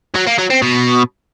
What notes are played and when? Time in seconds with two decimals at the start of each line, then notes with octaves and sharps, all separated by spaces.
0.15 F#3
0.27 A#3
0.38 F#3
0.50 C4
0.62 B2